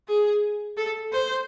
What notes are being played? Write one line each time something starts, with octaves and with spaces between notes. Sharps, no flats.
G#4
A4
C5